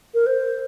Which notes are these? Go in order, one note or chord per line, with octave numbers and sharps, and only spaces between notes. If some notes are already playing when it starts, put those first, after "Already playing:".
A#4
C5